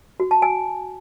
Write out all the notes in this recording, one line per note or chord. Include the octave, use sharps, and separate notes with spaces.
F#4
A5
G#5